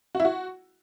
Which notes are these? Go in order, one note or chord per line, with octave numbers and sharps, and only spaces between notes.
F#4
E4
F#4